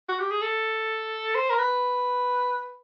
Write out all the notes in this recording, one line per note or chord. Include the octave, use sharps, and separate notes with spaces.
F#4
G4
G#4
A4
C5
A#4
B4